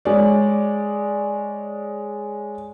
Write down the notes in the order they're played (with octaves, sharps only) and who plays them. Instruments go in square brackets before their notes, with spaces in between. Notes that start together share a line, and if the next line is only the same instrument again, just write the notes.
[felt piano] G#3 C#5 D5